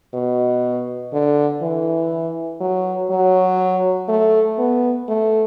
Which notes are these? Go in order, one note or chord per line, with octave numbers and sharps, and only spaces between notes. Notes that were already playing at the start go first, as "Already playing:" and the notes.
B2
D3
E3
F#3
F#3
A3
B3
A3